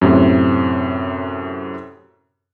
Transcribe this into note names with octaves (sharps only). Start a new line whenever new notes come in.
F#2 A2 C3